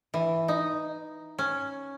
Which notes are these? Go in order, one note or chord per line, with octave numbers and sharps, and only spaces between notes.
E3
D#4
C#4